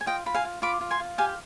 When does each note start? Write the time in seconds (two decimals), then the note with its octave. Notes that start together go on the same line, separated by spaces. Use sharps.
0.01 G#5
0.06 F4 D#5 G5
0.26 F4 B5
0.35 F5 G#5
0.45 F4
0.62 F4 B5 D6
0.81 F4
0.91 G#5 C6
1.00 F4
1.18 G4 F5 G#5